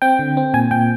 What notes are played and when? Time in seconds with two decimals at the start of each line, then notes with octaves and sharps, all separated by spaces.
0.02 C4 G5
0.19 D3
0.37 C4
0.54 A#2 G#5
0.71 A#2 G5